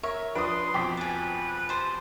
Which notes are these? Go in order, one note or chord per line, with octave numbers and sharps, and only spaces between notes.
A#4 C#5 E5
F3 D4 B4 C6 D#6 D7
F2 B2 F3 G5 D6 B6
G#4 B4 A5
G4 C5 A5